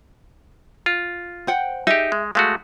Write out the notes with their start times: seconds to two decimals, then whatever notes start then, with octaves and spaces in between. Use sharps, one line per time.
0.86 F4
1.47 C5 F#5 G5
1.87 D#4 G4 G#4 E5
2.12 G#3
2.35 G#3 A3 F#4 F5